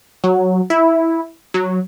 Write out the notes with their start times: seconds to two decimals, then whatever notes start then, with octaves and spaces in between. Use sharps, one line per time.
0.24 F#3
0.70 E4
1.54 F#3